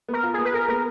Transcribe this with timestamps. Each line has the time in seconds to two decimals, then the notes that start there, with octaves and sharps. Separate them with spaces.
0.09 B3 A#4
0.23 F4
0.34 B3 G#4
0.45 B4
0.53 G#4 A#4
0.68 B3 A#4